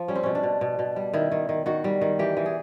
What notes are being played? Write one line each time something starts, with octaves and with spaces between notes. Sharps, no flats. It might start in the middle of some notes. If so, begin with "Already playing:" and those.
Already playing: F3
G3 C#4
C4
B2 C#4
D4
B2
B2
B2
G3
D#3 E4
D#3
D#3
D#3 F#4
G3
D#3
E3 G4
E3
G#4